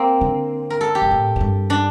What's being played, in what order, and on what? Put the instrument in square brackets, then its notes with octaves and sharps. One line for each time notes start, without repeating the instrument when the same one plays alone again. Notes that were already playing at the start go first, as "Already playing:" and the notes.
Already playing: [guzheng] A#3 C4
[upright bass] D3
[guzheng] A#4
A4
G4
[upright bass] G2
A2
A2
G2
[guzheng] D4